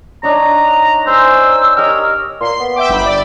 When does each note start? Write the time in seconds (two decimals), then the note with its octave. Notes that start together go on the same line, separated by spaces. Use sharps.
0.23 D4 D#4 C#5 A#5
1.07 C5 G#5 A#5 E6
1.77 G4 A#4 C#5 D#5
2.41 A#2 C6
2.60 B3
2.76 E5 G5 D6
2.89 G1 B5
3.06 D5